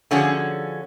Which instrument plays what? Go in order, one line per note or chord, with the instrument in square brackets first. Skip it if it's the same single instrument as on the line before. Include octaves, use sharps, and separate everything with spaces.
[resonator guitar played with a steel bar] D3 F3 C#4 F#4 G#4